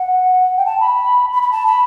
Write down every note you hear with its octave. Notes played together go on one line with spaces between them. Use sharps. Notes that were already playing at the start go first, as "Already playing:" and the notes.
Already playing: F#5
G5
A5
B5
B5
B5
A5
B5